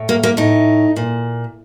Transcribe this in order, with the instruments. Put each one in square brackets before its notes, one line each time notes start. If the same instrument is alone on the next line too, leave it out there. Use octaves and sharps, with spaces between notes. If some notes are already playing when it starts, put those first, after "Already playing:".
Already playing: [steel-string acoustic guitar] A2
A#3
A#3
A2 D#4
A#2